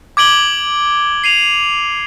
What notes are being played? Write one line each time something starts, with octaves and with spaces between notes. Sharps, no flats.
D6 G#6 D7 F#7 G7
C7 D#7 F7